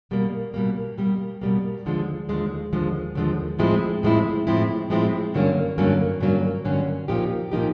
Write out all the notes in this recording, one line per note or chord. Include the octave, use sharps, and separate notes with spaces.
B2 G3 A#3
B2 G3 A#3
B2 G3 A#3
B2 G3 A#3
D#2 D3 F3 G#3
D#2 D3 F3 G#3
D#2 D3 F3 G#3
D#2 D3 F3 G#3
A2 F3 G#3 C4 E4
A2 F3 G#3 C4 E4
A2 F3 G#3 C4 E4
A2 F3 G#3 C4 E4
G2 D3 F#3 A#3 C#4
G2 D3 F#3 A#3 C#4
G2 D3 F#3 A#3 C#4
G2 D3 F#3 A#3 C#4
A#2 F3 A#3 D#4 G4
A#2 F3 A#3 D#4 G4